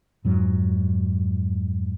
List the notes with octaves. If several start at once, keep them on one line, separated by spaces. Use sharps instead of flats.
F2 G#2 F#3